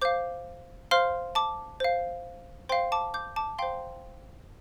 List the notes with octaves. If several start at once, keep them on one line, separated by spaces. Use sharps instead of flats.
C5 F5 D6 G6
C5 F5 C6 F6
A5 D6
C5 F5
C5 F5 G5 C6
A5 D6
D6 G6
A5 D6
C5 F5 G5 C6